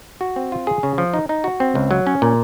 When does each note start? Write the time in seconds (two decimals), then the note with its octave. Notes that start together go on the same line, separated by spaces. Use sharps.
0.21 F#4
0.36 C4
0.52 F4
0.67 G#4
0.83 C#3
0.98 F3
1.14 D#4
1.29 D#4
1.44 F#4
1.60 C4
1.75 C#2
1.91 F#3
2.07 C#4
2.22 A#2